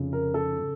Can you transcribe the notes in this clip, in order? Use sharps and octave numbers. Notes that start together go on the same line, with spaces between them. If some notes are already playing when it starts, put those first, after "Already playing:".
Already playing: F1 F2 C#3
A#4
A4
C#3